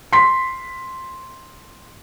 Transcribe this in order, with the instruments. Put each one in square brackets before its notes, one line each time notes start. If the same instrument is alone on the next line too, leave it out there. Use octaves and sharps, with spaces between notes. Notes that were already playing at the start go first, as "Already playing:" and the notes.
[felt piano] C6 B6